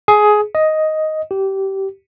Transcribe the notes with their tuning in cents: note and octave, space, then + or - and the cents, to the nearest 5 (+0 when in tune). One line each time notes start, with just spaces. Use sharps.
G#4 +15
D#5 +5
G4 -20